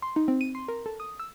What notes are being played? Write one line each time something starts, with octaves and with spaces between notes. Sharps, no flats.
C6
D#4
C4
D#7
C6
A#4
A4
D#6
E6